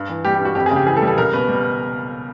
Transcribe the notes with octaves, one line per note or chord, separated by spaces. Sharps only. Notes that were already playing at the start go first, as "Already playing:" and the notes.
Already playing: G2
E3
G3 G4
G4
G2 F#4
F2 G4
G#4
C#3
G4
E3 G#4
A4
G3
A4
C#2 A#4
B2 B4
G3